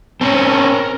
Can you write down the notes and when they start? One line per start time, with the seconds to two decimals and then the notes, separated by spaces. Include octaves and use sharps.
0.21 C4 C#4 A#4 A5